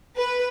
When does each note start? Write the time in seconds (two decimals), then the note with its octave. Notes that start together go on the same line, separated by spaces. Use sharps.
0.16 B4